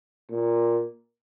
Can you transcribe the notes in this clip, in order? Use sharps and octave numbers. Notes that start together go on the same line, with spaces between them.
A#2